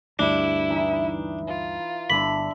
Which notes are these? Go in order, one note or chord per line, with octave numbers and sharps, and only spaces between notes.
D2 G2 D4 E4
E3 D#4 B5
F4
G1 D3 E5 B5 D6